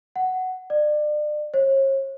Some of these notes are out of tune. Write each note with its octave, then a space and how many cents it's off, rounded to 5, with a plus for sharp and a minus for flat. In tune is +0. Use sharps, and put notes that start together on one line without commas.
F#5 +5
D5 +35
C#5 -40